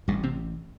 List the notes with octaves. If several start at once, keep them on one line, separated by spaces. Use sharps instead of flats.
A1 G2 G3
C3 C4